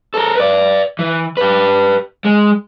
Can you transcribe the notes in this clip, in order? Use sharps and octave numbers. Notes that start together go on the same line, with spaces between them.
A4 A#4
B4 D5
E3
G4 B4
G#3